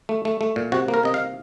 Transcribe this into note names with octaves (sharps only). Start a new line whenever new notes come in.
A3
A3
A3
A#2
C3 F#4
A#3
A#4
C3 D#5
F5